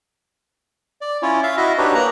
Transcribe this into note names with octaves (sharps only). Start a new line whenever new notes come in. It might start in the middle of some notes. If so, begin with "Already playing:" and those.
D5
C#4 E4 F4 C#5
E5 F5
E4 F#4 D#5 E5
D4 D#4 F#4 G4 B4 C#5
A#3 A#5 F#6